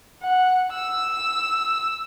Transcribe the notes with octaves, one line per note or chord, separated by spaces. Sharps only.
F#5
E6